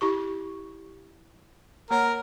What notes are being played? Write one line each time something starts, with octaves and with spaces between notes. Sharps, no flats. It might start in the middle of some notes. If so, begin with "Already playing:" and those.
E4 G4 C#6
A#3 A#4 C#5 F#5